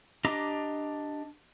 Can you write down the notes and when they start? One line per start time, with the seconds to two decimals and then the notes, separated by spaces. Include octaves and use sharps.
0.25 D4 G4 D#5 A#5 D6